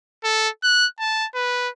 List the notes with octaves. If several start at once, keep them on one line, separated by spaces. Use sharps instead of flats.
A4
F#6
A5
B4